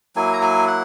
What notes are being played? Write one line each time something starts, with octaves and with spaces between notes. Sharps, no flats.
F#3 A#3 E4 G#5
A#5
G#5
F#5